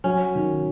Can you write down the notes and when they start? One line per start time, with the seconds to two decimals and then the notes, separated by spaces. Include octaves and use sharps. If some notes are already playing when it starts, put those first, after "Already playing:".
0.04 F#3 C#4
0.35 D#3